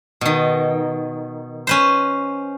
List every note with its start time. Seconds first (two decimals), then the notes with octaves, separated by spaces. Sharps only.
0.21 B2 D#3
1.67 C#4 B4 C5